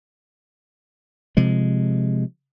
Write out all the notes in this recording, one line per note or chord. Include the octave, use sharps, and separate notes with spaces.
C3 F3 G#3